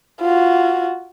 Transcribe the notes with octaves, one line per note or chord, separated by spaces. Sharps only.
F4 F#4